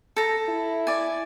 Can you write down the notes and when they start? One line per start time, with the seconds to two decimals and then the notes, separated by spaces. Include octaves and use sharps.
0.16 A4 A#5
0.49 E4
0.87 D5 G#5